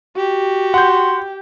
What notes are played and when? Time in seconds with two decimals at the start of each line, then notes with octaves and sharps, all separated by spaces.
0.17 F#4 G4
0.74 F#5 C6 G6